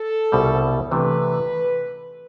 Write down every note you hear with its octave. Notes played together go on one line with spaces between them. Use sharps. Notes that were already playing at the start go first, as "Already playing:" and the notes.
Already playing: A4
C2 B2 G3
C3 E3 A3 D4 B4